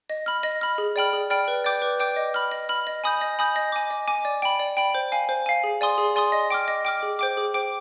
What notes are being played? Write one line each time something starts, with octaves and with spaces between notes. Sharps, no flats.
D#5
B5 F6
D#5
B5 F6
G#4
D5 G5 B5 F6
G#4
D5 G5 B5 F6
B4
D5 G5 D6 G6
B4
D5 G5 D6 G6
D#5
B5 F6
D#5
B5 F6
D#5
G#5 B5 D#6 G6
D#5
G#5 B5 D#6 G6
D#5
G#5 D6
D#5
G#5 D6
D5
G5 B5
D5
G5 B5
C5
F5 G#5
C5
F5 G#5
G#4
D5 G#5 C6 D#6
G#4
D5 G#5 C6 D#6
D#5
G5 D6 F6
D#5
G5 D6 F6
G#4
C5 G5 D6
G#4
C5 G5 D6